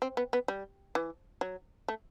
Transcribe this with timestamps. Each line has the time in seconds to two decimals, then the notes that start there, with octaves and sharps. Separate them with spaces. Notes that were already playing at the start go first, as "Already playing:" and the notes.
0.02 C4
0.17 B3
0.33 B3
0.48 G3
0.95 E3
1.41 F#3
1.88 A3